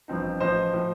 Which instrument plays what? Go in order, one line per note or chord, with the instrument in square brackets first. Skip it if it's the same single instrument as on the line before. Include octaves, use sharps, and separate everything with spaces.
[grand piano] A1 G2 F3 C4 D#4
A1 A2 F3 C5 D#5
A2 F3